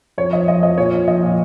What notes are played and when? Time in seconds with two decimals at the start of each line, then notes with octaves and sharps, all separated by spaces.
0.18 F2 C#5
0.33 F3 D#5
0.48 F3 D#5
0.63 F2 D#5
0.78 A#2 C#5
0.93 F3
1.08 F3 D#5
1.23 A#2